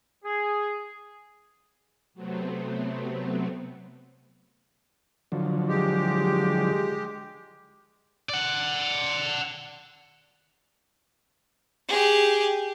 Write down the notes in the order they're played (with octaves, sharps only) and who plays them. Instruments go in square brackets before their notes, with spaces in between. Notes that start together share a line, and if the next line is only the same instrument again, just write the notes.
[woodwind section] G#4
[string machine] C3 F#3 A3 B3 C4
[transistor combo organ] D3 F3 F#3
[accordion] G#3 G4
[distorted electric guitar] D5 F#5
[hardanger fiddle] G4 G#4